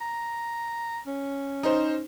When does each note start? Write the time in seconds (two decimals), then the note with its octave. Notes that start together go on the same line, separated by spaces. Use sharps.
0.01 A#5
1.07 C#4
1.63 D#4 C5